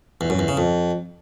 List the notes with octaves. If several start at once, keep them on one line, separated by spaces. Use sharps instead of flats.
E2
F#2
E2
C#3
F2